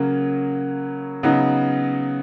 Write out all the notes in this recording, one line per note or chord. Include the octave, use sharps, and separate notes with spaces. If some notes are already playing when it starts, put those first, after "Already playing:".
Already playing: C#3 F#3 A#3 C#4
C#3 F#3 B3 D#4